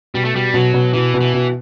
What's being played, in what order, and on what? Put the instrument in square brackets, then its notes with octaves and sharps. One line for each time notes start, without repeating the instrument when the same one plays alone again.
[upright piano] B2 [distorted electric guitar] G3
[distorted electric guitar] A3
[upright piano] B2 [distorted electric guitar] G3
[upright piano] B2 [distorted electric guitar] F#3
[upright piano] B2
[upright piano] B2 [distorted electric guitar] E3
[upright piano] B2
[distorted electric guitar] E3
[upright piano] B2